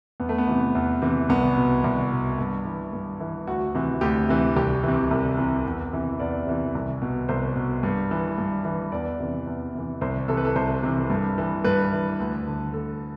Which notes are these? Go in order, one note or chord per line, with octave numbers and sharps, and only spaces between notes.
E2 B3
A3
B3
C3 E3
E2
C3 E3
C2 B3
B2
C2
B2
G2
E3
G2
E3
D2 F#4
C3 E3
D2 G4
C3 E3
C2 G4
C3 E3
C2
C3 E3
E2
C3 E3
E2 D5
C3 E3
C2
B2
C2 C5
B2
G2
E3
G2
E3
E2 D5
C3 E3
E2
C3 E3
C2 C5
C3 E3 A4
B4
A4
C2 C5
C3 E3
G2
E3
G2 B4
E3
D2
D3
D2 A4